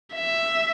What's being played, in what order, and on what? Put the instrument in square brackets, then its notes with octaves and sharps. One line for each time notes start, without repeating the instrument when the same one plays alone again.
[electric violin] E5